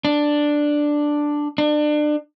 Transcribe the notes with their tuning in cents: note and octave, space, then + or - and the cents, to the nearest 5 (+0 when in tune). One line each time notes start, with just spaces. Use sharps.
D4 +5
D4 +30